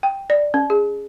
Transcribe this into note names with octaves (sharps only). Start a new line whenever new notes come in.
G5
D5
C#4
G#4